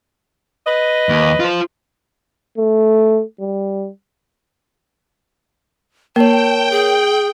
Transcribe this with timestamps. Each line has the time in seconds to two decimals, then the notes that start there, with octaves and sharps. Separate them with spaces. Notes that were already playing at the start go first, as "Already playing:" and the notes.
0.66 B4 D#5
1.09 D#2
1.40 F4 C5
2.58 A3
3.40 G3
6.16 A#3 A#4 C#5 G5 A5
6.71 G#4